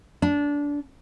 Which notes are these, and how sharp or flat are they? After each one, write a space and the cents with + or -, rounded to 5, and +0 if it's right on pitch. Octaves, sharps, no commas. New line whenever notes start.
D4 -20